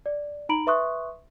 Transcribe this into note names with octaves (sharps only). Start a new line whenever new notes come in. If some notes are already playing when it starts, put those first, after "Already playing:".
D5
D#4 A#5 B5 D7 F#7
B4 E5 C6 C#6 D#6 F#6